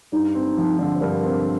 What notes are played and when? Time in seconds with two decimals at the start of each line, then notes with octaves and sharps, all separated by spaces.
0.12 G2 D#4
0.35 C4
0.57 F3
0.79 D3
0.95 C5
1.01 G2 A#4
1.23 C4